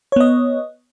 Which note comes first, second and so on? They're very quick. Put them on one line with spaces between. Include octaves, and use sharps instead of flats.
C#5 B3 D#5